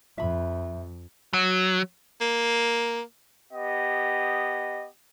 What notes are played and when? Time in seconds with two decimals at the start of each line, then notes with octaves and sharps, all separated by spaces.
0.18 F2 E5 B5
1.33 F#3
2.21 A#3
3.52 B3 G4 D#5